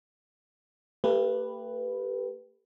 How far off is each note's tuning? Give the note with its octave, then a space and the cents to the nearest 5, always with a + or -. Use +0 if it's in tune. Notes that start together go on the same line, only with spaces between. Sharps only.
A3 +45 G4 +10 B4 +0